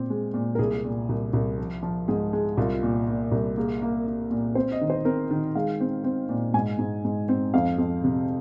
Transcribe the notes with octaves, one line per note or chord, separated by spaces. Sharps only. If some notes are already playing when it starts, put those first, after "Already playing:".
Already playing: A#2 C4
G#3
A#2
A#4
C2 G#4
A#2
C2
C2
F3
F3
G#2 G#4
G#3
C2 F4
F4
A#2
A#2
C2
A#3 G#4
A#3
A#3
A#2
C4 C5
D#5
D#3
C5
C4 A#4
D#3
G#3 F5
C4
C4
A#2
G#2 G#5
G#2
G#2
C4
F2 F5
F2
C3